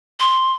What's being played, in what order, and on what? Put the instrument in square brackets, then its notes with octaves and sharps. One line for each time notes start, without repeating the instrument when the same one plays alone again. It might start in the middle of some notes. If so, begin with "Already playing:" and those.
[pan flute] C6